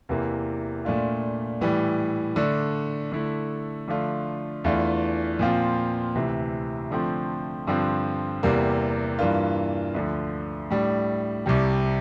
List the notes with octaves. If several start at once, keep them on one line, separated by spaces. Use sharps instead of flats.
E2 C3 E3 A#3
A#2 A3 D4 F4
A2 E3 G3
D3 A3 D4
D3 A3 E4
D3 F3 A3 D4 F4
E2 E3 A3 D4 F4
A#2 F3 C4 F4
D2 C3 E3
D3 F3 A3 C4
G2 D3 F3 C4
E2 C3 G3 A#3
G2 E3 A#3 D4 F4
D2 D3 F3
A2 G3 D4
C2 C3 G3